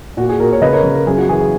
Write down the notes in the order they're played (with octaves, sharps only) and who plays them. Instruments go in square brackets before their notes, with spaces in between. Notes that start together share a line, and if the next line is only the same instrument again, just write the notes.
[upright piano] A#2 F#4
G#4
A#2 F#4 A#4
C#5
C#3 B4 D#5
A#4 C#5
C#3
A#4
F#2 G#4
F#4
E3 G#4